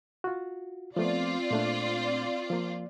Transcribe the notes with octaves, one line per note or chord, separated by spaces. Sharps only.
F4 F#4
F3 A3 B3 C4 F4 D5
A#2 A3 D4
F3 A#3